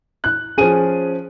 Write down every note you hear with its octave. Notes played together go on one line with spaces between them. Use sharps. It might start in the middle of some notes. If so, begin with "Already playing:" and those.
F#6
F3 C#4 G#4 D#7